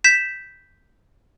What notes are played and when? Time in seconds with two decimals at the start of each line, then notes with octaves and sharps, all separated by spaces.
0.04 G6 B6 E7